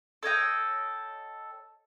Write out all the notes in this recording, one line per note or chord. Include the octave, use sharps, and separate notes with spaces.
A4 C#5 D#5 G5